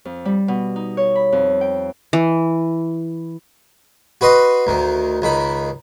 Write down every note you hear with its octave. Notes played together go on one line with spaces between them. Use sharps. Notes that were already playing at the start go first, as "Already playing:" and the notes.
F2
G3
B2
D#4
C#5
B5
F2
G5
E3
F#4 B4 D#5 C6
D2 D#3
C#2 D#3 B5